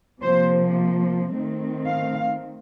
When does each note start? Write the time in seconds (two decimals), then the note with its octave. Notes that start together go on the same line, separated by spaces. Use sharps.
0.21 C3 F3 A#3 C5
1.32 D#3 A3 C4
1.86 F5